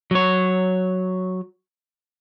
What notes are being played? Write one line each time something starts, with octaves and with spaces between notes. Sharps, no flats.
F#3 C#5